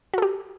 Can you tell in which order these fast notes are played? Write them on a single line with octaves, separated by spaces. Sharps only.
F#4 A4 G4